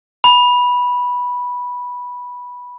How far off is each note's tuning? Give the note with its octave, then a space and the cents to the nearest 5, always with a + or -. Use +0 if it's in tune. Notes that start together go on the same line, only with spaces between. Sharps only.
B5 -10